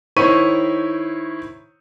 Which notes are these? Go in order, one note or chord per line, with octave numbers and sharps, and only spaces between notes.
D#3 E4 C5 C#5 C#6 D#7